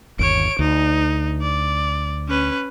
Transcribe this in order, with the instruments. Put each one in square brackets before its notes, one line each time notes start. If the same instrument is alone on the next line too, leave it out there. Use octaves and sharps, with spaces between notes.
[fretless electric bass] G1 D#2 [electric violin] C#5 D7
[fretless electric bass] D2 [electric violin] D#4
[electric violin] D5
C#4 B4